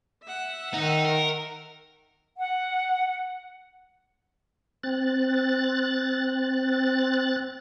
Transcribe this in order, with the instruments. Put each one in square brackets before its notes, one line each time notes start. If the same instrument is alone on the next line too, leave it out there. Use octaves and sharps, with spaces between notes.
[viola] E5 F#5
[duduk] D#3 [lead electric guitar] D#4
[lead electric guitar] A#4
[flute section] F#5
[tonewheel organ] C4 F#6 A6